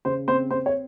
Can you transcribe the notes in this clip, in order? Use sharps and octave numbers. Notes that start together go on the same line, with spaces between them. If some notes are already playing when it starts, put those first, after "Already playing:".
C#3 C5
C4 C5
C4 C5
C#5